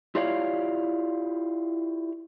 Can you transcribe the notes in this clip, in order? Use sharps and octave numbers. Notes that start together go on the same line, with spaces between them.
E4 F4 G4 C#5 D5 F5